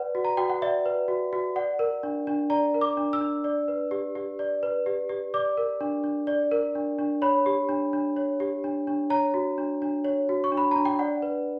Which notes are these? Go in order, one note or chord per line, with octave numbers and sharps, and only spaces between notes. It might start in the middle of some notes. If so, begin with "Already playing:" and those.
Already playing: B4 D5 F#5
F#4
A#5
F#4 G5
F#5
D5 E5
B4
F#4
F#4
D5 F#5
A#4
D4
D4
D5 A#5
A#4
D6
D4
E6
D4
D5
B4
G4
G4
D5
B4
G4
G4
D5 D6
A#4
D4
D4
D5
A#4
D4
D4
C#5 B5
G4
D4
D4
C#5
G4
D4
D4
C#5 A#5
F#4
D4
D4
C#5
F#4
C#6
D4
B5
D4 A#5
G5
D5 F#5
B4